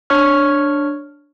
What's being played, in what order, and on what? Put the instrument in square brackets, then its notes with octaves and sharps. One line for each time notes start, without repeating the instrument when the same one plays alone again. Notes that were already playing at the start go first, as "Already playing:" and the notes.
[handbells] D4 C#5 C#6 F6